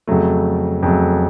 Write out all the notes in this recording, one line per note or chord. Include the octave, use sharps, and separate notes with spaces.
F2 C#3 F#3 A3
F2 C#3 F#3 A3